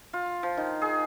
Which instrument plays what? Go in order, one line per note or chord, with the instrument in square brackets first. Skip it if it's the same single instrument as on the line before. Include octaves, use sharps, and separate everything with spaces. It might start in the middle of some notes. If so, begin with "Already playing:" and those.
[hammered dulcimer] F4
F3
D#3
G#4